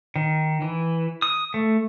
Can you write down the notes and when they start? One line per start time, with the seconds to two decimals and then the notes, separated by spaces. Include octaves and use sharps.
0.16 D#3
0.62 E3
1.22 D#6
1.54 A3